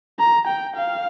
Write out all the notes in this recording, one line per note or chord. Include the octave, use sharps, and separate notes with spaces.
A#5
G5
F5